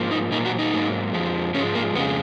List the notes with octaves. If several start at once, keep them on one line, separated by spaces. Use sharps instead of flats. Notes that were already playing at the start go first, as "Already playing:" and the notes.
Already playing: G#2 F3 A#3
D#4
A#2 F#3 A#3 D#4
F#4
D#4
G#2 F#3 A#3
F2 F3 G#3
G#2 F3 G#3 C#4
A#3
F2 C#3 G#3 B3